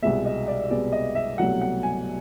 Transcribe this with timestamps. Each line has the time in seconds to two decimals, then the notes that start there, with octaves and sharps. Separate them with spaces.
0.02 C2 B2 G#3 B3 E5
0.25 D#5
0.48 D5
0.70 C2 B2 G#3 B3 D5
0.92 D#5
1.15 E5
1.38 C2 B2 F#3 A3 F#5
1.61 F#5
1.83 G#5